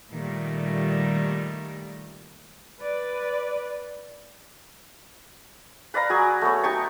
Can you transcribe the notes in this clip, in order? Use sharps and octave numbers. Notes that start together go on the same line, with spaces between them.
A#2 D#3 G3 A3
B4 D5
B4 D5 F5 A#5
F#3 G#4 G#5
A3 B3 C#5
D#4 G4 A5 C#6